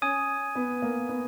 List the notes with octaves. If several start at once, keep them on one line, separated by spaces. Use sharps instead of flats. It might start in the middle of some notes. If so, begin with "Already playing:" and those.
C#4 G#5 D#6 G#6 D#7
B3
A#3
B3